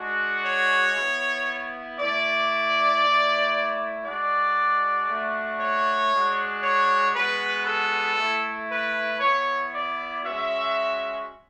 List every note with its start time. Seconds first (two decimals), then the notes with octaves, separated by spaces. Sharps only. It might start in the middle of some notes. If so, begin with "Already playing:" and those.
Already playing: G#3 D4 F#4
0.44 C#5
0.96 B3 E4
1.98 A3 E4 D5
3.02 A3 E4
4.04 G#3 D4 F#4 D5
5.08 A3 D4 F#4
5.60 C#5
6.12 G#3 D4 F#4
6.62 C#5
7.14 G#3 B3 F#4 B4
7.66 A4
8.18 A3 E4
8.70 B4
9.21 B3 E4 C#5
9.73 D5
10.24 G#3 C#4 F#4 E5